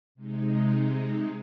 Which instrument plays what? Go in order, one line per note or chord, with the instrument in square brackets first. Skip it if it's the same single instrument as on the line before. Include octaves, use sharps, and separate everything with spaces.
[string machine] C3 G#3 D#4